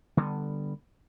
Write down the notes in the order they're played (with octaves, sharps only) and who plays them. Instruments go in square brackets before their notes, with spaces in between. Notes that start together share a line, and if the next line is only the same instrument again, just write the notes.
[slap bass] D3 G3 B3